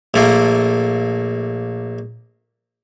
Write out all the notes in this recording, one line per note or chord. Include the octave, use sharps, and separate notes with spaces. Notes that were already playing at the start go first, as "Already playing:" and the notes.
A#1 A3 A#3